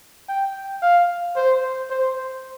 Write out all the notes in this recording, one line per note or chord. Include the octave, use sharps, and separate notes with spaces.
G5
F5
C5
C5